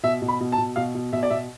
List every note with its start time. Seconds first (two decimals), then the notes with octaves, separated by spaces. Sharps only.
0.03 B2 E5
0.22 B2
0.28 B5
0.40 B2
0.52 A5
0.58 B2
0.76 B2 F5
0.95 B2
1.13 B2 E5
1.23 D5
1.30 B2 E5